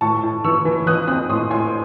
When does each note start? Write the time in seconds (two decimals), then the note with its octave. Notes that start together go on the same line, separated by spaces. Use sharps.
0.01 A2 A5 C#6
0.23 A2
0.44 E3 C#6 E6
0.65 E3
0.86 E3 D#6 F#6
1.07 C4 D#6 F#6
1.29 A2 C6 D#6
1.50 A2 G#5 C6